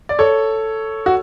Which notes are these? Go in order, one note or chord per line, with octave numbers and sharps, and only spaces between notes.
D5
A4 C#5
F#4